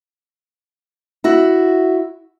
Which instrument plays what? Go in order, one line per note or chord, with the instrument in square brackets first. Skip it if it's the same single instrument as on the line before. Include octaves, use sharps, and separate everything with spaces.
[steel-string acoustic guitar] E4 F#4